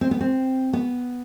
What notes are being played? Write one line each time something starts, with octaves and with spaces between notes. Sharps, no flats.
C4
B3
C4
B3